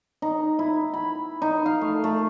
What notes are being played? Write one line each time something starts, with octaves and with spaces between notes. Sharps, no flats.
D#4
E4
B5
D#4
F5
A3
A3